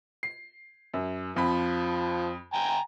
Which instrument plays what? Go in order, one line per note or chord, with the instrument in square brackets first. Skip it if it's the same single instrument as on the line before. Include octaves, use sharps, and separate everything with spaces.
[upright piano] C7
F#2
[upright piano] F2 B5 [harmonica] F3
[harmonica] G5 G#5 A#5